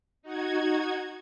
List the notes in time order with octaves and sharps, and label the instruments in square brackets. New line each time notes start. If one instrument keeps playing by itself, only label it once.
[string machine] D#4 F#4 G#6